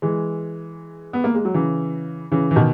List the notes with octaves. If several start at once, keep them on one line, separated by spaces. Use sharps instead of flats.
E3 G#3
B3
A#3
G#3
F#3
C#3 E3
C#3 E3
E3
B2 D#3